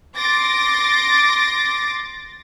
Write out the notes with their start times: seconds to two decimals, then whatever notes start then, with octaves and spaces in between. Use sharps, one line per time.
0.16 C6 D6 A6 A#6